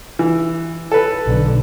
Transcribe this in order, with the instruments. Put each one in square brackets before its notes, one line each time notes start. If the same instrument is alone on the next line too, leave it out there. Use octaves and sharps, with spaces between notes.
[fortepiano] E3
A4 B4
[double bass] B1 D3